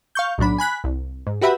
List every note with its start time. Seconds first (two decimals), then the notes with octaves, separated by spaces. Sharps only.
0.15 F5 C#6 G6
0.38 B1 A2 F#3 D4 B5
0.58 G#5 B5 F#6 B6
0.84 C2
1.27 G#2
1.41 F#4 G4 B4 E5 F#5 B5